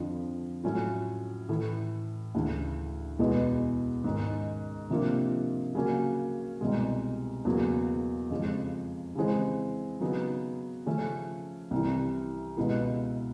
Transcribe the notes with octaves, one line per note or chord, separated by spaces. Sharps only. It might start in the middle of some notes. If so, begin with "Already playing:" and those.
Already playing: F2 D3 F3
A2 F#3 A3 C#4 F4
A2 E3 A3
D2 C#3 E3
E2 B2 G#3 B3 E4
G#2 D#3 G#3 C#4
C3 F3 A#3 D4 F4
C#3 F#3 A#3 C#4 F#4
C2 B2 G#3
E2 C#3 F#3 A#3
F2 C#3 F3 G#3
C#3 E3 G#3 C4
C#3 F#3 B3 D#4
C#3 F3 A3 C#4
C2 C3 E3
C#2 B2 G#3 B3 E4